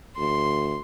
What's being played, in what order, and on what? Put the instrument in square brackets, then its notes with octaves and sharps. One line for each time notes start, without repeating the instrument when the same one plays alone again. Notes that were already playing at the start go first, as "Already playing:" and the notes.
[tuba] D2 [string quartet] C6